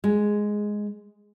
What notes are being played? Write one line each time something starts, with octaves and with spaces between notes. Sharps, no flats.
G#3